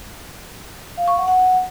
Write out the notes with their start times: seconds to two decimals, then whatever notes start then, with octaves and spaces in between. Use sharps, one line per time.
0.97 F5
1.08 C#6
1.18 F#5
1.28 F#5